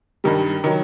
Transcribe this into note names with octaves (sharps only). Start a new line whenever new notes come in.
G2 D#3 G3
D#3 F#3